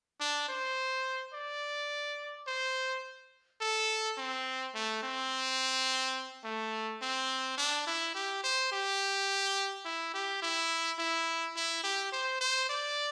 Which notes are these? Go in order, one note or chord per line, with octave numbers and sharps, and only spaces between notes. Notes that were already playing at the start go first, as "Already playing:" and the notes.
D4
C5
D5
C5
A4
C4
A3
C4
A3
C4
D4
E4
G4
C5
G4
E4
G4
E4
E4
E4
G4
C5
C5
D5